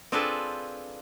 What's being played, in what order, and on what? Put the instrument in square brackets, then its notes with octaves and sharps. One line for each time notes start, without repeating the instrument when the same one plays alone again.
[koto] C4 D4 F4 G#4 A4 B4